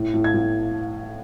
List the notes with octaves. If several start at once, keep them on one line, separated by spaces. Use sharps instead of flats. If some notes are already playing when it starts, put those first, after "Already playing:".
Already playing: A2
A2
G#6
A2